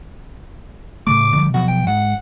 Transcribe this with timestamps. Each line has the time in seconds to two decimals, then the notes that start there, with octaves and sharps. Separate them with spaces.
1.07 A2 C#3 A3 D6
1.36 D3 F3 G3
1.54 B2 F3 F#3 F#4
1.68 G5
1.87 G#2 F#5